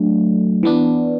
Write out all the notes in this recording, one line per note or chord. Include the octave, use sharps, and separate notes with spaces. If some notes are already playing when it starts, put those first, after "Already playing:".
Already playing: F#3 A3 D4
E3 B3 D4